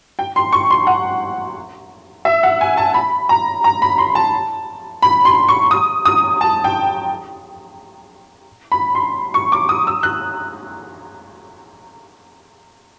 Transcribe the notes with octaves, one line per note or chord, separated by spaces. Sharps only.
G5
C6
C#6
C6
F#5
E5
F#5
G#5
A5
B5
A#5
A#5
B5
C6
A5
B5
C6
C#6
D#6
D#6
A5
G5
B5
C6
C#6
D6
D#6
E6
F#6